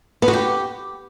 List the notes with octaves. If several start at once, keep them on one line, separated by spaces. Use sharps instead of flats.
B3
F#4
G4